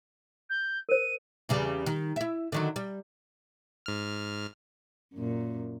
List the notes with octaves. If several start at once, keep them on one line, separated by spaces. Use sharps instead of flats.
G6
A#4 C5 D#7
E2 C#3 G3
D#3
E4 E5
D3 D#3 F#3
G3
G#2 F6
F#2 A#2